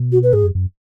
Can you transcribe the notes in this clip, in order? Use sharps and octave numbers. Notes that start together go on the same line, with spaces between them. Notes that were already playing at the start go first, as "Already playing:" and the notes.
Already playing: B2
F#4
B4
G#2 G#4
F#2
F#2